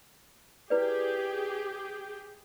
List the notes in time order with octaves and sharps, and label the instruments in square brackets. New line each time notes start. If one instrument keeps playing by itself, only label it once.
[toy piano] E4 B4 D5 [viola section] G4 G#4